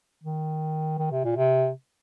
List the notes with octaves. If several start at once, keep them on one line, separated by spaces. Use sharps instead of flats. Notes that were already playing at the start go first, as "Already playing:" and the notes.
D#3
D#3
C3
A#2
C3